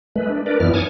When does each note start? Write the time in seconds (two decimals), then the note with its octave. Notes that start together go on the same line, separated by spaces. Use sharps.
0.16 G#3 A3 B4
0.29 D4
0.46 D4 A#4 B4 D5
0.60 F#2 E3 B3 D#4 E4 F6
0.74 C#5 G#5 A5 D6 D#6 F6